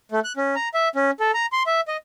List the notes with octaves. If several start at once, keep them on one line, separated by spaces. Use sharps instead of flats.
A3
F#6
C#4
A#5
E5
C#4
A4
A#5
C6
E5
D#5